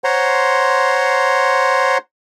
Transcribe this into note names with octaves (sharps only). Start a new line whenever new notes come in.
C5 C#5 F#5 A#5 C6